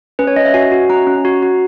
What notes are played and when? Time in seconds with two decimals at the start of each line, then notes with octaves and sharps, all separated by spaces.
0.19 C#4 B4
0.27 C#5
0.36 C#4 D#5
0.45 E5
0.54 F#4 G#5
0.72 F#4
0.90 C#4 A#5
1.07 C#4
1.25 F#4
1.43 F#4